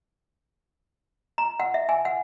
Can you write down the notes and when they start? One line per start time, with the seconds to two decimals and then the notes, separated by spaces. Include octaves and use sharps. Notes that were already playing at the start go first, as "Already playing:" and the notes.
1.38 A#5
1.60 F#5
1.74 E5
1.89 G#5
2.05 F#5